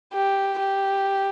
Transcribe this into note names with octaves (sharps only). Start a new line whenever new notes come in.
G4
G4